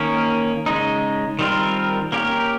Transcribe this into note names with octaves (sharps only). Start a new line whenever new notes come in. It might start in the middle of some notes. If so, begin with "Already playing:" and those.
Already playing: D#3 A#3 C#4
C#3 G#3 D#4
D#3 G3 C4 F4 A#4
A#3 C#4 G4 A#4